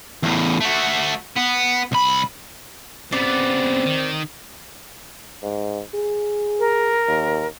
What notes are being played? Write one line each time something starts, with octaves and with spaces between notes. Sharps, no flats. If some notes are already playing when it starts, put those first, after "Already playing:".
E2 A2
A3 F#4
B3
C2 B5
C#3 B3 C4 D5
D#3
G#2
G#4
A#4
D#2